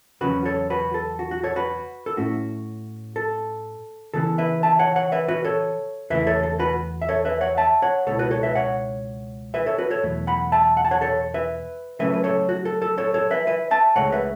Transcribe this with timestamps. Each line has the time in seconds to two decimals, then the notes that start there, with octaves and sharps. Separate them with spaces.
0.21 E2 C#3 F#3 C#4 F#4 B4
0.45 A4 C#5
0.70 F#4 B4
0.94 A4
1.19 F#4
1.31 F#4
1.43 A4 C#5
1.56 F#4 B4
2.06 A4
2.17 A2 A3 C#4 E4 F#4
3.16 A4
4.14 C#3 E3 B3 A4
4.38 B4 E5
4.63 E5 A5
4.79 C#5 F#5
4.96 C#5 F#5
5.12 B4 E5
5.28 F#4 B4
5.45 A4 C#5
6.10 E2 C#3 A3 E4 B4 E5
6.27 A4 C#5
6.43 A4
6.59 F#4 B4
7.02 E5
7.09 A4 C#5
7.25 B4 E5
7.41 C#5 F#5
7.57 E5 A5
7.82 C#5 F#5
8.07 C#2 B2 B3 E4 A4 C#5
8.19 F#4 B4
8.31 A4 C#5
8.43 B4 E5
8.55 C#5 F#5
9.54 B4 E5
9.66 A4 C#5
9.78 F#4 B4
9.91 A4 C#5
10.03 E2 B2 F#3 A3
10.27 F#5 B5
10.52 E5 A5
10.77 F#5
10.85 A5
10.91 C#5 F#5
11.01 A4 C#5
11.34 B4 E5
12.00 C#3 F#3 A3 C#4 B4 E5
12.14 B4
12.24 A4 C#5
12.49 F#4
12.65 A4
12.82 A4
12.98 A4 C#5
13.14 A4 C#5
13.30 B4 E5
13.47 B4 E5
13.71 E5 A5
13.96 C#2 C#3 A3 C#5 F#5
14.12 B4 E5